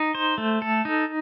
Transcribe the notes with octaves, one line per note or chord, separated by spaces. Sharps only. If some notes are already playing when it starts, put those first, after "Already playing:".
Already playing: D#4
C5
A3
A4
D#4